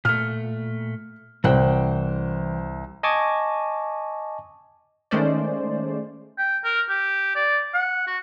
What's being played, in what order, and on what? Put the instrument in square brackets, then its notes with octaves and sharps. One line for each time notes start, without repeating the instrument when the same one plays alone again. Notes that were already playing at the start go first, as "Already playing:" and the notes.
[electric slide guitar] A#2 A3 [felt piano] F6
[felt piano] C2 C5 [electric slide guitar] E3 F#5 G5
[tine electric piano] D#5 G#5 A5 C#6 D6
[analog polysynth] D#3 G#3 A3 C#4 C5 D5
[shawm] G5
A#4
G4
D5
F#5
F#4